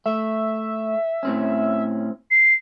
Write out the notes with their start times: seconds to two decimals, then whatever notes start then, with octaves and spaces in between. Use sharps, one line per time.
0.06 A3 E5
1.23 A2 C4 C#4
2.31 C7